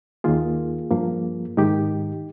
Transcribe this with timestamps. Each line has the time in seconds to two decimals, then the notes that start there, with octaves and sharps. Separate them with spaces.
0.24 D#2 D#3 A#3 F4 G#4
0.91 G2 F3 A#3
1.57 G#2 D#3 G#3 D#4 G4